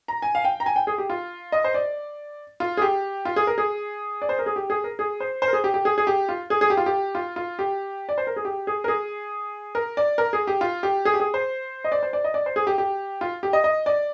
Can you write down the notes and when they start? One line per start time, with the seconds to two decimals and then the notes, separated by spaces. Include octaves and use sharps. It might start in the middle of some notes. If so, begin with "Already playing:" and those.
0.08 A#5
0.22 G#5
0.35 F5
0.45 G5
0.60 A#5
0.66 G#5
0.76 G5
0.87 G#4
0.98 G4
1.10 F4
1.52 D#5
1.64 C5
1.74 D5
2.60 F4
2.77 G#4
2.82 G4
3.25 F4
3.36 G#4
3.47 A#4
3.58 G#4
4.22 D5
4.29 C5
4.39 A#4
4.46 G#4
4.56 G4
4.70 G#4
4.84 A#4
4.99 G#4
5.20 C5
5.42 C5
5.48 A#4
5.53 G#4
5.64 G4
5.74 G4
5.85 G#4
5.98 G#4
6.07 G4
6.29 F4
6.50 G#4
6.61 G#4
6.70 G4
6.77 F4
6.86 G4
7.15 F4
7.36 F4
7.59 G4
8.09 D5
8.18 C5
8.27 A#4
8.36 G#4
8.45 G4
8.67 G#4
8.84 A#4
8.88 G#4
9.75 A#4
9.97 D5
10.18 A#4
10.33 G#4
10.47 G4
10.61 F4
10.83 G4
11.05 G#4
11.14 G4
11.20 G#4
11.34 C5
11.84 D#5
11.92 D5
12.03 C5
12.13 D5
12.24 D#5
12.34 D5
12.46 C5
12.56 G#4
12.67 G4
12.78 G4
13.21 F4
13.43 G4
13.53 D#5
13.64 D#5
13.86 D5